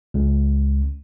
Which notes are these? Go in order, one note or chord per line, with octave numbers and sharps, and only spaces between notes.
C#2